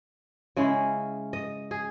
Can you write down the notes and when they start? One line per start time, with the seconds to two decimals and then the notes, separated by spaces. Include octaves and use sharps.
0.56 C#3 G#3 C#4 E4
1.33 D#5
1.71 G#4